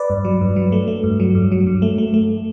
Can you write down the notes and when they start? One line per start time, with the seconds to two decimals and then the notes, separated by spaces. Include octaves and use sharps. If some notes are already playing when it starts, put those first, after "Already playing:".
Already playing: B4 D5
0.10 G2
0.25 F#3
0.41 G2
0.56 F#3
0.72 A3
0.88 A3
1.04 G2
1.20 F#3
1.35 G2
1.52 F#3
1.67 G2
1.82 A3
1.98 A3
2.14 A3